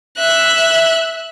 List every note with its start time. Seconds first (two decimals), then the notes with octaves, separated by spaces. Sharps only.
0.18 E5 F#6